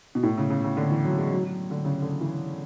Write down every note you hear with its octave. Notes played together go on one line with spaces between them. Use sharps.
B2
A2
C#3
C#3
C#3
D3
E3
F#3
G#3
F#3
F#3
D3
C#3
D3
E3